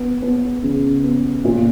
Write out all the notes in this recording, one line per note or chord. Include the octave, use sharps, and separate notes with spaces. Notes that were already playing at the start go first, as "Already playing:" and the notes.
Already playing: B3
B3
C#3
B3
A#2